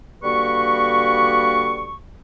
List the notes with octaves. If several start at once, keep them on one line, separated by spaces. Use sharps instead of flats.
D3 G3 A#3 F#4 B4 C#6